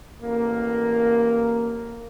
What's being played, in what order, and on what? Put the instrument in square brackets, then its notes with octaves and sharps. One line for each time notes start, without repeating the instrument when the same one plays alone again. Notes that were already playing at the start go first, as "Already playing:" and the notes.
[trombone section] A1 A#3